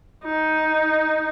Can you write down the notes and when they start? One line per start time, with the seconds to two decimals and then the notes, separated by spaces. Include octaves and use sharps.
0.24 D#4